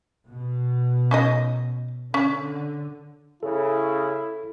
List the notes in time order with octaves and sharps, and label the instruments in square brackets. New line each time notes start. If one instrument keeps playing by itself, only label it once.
[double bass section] B2
[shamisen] C#4 D#4 D#5
[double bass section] D3 [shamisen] C#4
[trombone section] C#3 [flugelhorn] E4 [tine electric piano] A4